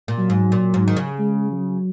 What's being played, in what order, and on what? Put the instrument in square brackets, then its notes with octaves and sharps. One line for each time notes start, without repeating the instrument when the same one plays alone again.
[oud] A#2
[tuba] F#3
[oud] G#2
A#2
G#2
D#3
C#3
[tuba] G#3
F#3